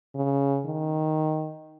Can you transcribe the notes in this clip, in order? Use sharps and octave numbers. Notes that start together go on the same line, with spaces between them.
C#3
D#3